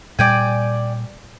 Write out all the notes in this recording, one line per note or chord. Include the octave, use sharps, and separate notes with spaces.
A#2 G3 D5 G5 G#5